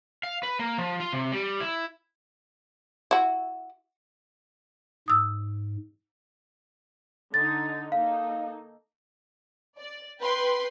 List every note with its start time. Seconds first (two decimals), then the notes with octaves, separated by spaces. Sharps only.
0.23 F5
0.43 B4
0.59 A#3
0.78 F3
1.00 F4
1.13 C3
1.32 G3
1.60 E4
3.11 E4 F#4
5.08 G#2 D#6 E6
7.34 D3 D#4 A6
7.92 A#3 D#4 A4 F5
9.78 D5
10.20 B4 G5 B5 C6